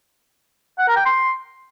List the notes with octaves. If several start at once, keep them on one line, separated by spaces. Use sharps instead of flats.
F#5
A#4
G5
C6